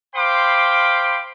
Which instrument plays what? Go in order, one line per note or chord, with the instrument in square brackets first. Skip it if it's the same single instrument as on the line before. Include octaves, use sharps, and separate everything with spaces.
[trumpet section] C5 F5 G5 B5 C6 D6